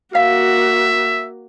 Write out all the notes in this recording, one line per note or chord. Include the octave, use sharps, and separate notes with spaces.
A#3 F#4 E5 F5